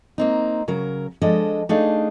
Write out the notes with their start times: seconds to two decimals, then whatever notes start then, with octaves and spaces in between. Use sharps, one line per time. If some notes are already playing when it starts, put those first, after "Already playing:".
0.18 A#3 C4 D#4
0.68 C#3 F#3 A#4
1.22 F3 G#3 D4 A4 D#5
1.69 A3 D4 D#4 G#4 F5